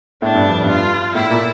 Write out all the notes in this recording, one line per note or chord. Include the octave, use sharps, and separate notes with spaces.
A2 D4
G2
F2
G2
F4
A2 E4
A#2